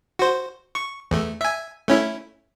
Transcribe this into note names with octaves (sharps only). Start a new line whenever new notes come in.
F#4 C5
C#6
E2 A3
E5 G#5
A3 C#4 E4